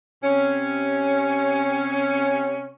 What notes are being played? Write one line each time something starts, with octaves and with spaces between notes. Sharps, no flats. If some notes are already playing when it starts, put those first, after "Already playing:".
C3 C#4